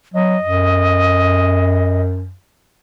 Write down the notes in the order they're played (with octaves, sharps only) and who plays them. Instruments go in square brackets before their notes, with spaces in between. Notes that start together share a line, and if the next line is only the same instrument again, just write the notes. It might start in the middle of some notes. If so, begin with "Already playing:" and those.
[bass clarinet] F#3 [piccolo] D#5
[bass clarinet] F#2